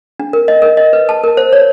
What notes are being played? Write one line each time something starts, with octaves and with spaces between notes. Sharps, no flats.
D4
A#4
D#5
A#4
D#5
B4
A5
A#4
C5
C#5